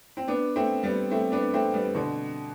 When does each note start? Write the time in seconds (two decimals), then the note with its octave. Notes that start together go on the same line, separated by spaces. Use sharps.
0.17 C4
0.28 B3 D4
0.56 A3 C4
0.83 G3 B3
1.11 A3 C4
1.32 B3 D4
1.53 A3 C4
1.74 G3 B3
1.94 B2 D3